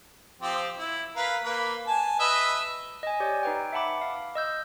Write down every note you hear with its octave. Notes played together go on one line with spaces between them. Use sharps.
F3 C4 G4
E4
A#4 B4 F5
A#3 B4
G#5 A5
B4 D#5 E5
D#5 G#5
G4 C#5 D5 G6
D#4 B4 G5
E5 F#5 A5 B5 D6
F5
D#5 E6 G6